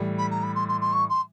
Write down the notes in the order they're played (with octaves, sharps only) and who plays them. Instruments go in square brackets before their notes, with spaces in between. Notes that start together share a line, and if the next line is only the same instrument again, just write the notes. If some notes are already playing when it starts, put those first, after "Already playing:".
Already playing: [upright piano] A2 E3 G3
[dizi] B5
A#5
B5
C6
C6
C6
C#6
C6